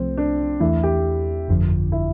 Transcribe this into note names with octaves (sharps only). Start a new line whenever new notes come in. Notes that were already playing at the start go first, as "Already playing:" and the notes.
Already playing: C2 F3 A3 C4
D4
E2 E3 A3 E4
G4
G1 F2 D3 F3
E4